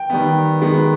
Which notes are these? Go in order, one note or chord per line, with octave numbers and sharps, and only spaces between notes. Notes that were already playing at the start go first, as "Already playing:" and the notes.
Already playing: G5
D#3 G3 B3
D#3 G#3 B3